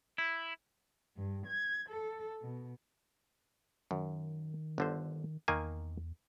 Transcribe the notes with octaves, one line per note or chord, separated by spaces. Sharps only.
E4
G2
G#6
A4
B2
F#2 D#3
G1 D3 C5
E2 D#3 A#3 G#5